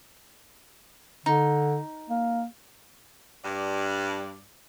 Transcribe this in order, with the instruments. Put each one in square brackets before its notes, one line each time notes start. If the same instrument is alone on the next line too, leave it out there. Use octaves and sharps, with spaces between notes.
[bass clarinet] D3 [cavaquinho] D#4
[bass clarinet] A#3
[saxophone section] G2 D5